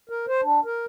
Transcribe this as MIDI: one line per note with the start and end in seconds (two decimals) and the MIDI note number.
0.09 0.26 70
0.28 0.41 72
0.43 0.60 62
0.65 0.86 70